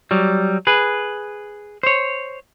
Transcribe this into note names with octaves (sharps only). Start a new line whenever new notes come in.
F#3 G3
G#4 B4
C5 C#5